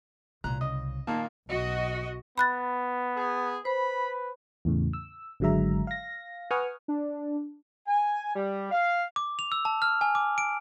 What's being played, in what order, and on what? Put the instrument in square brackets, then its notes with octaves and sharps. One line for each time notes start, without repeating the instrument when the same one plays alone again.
[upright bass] C2 [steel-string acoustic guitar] A#2 A#5 [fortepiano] F#6
[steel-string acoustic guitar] C#3 [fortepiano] D#5
[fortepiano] A#2 D#3 A#3 [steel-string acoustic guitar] A5
[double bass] B1 [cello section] F#4 D#5
[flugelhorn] B3 [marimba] B5 F#6 A6
[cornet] G#4
[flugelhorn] B4 [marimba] C5 [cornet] B5
[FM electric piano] E2 A2 C#3
E6
G#1 D3 F#3 G#3 E5 A#5
F5 A#6
B4 F#5 G#5 C#6 D#6 F6
[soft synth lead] D4
[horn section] G#5
G3
F5
[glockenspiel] D6
F7
E6
A5
F6
G#5
D6
D7